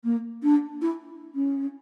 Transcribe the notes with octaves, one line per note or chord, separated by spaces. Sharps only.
A#3
D4
E4
C#4